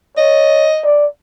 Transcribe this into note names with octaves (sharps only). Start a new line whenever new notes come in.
C#5 D#5
D5